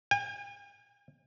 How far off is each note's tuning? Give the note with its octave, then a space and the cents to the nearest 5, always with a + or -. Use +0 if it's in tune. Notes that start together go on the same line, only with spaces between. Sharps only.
G#5 -45